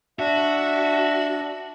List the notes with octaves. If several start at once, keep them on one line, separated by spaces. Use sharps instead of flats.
D4 F#4 E5